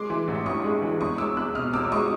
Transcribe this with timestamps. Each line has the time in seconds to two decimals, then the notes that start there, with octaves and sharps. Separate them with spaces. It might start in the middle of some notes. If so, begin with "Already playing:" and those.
Already playing: G#3 C6 D6
0.10 E3
0.28 A1
0.46 G2 C#6 D#6
0.64 G#3
0.82 E3
1.01 E2 C#6 D#6
1.18 G#3 D6 E6
1.37 E2 E6 F#6
1.55 B2 D#6 F6
1.73 E2 D6 E6
1.83 D6
1.92 G#3 C#6 D#6